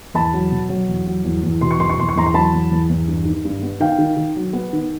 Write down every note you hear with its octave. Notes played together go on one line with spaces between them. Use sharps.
E2 A5 B5
F#3
B2
F#3
E2
F#3
E2
E2
B2 C6
C#6
E2 C6
C#6
E2 C6
C#6
E2 A#5 C6
C6
F#3 A5 B5
E2
E2
E2
G2
D#3
G2
B3
D#3 F5 G5
D#3
D#3
F#3
B3
D#3